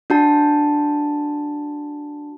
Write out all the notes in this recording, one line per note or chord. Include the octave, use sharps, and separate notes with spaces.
D4 F#4 A5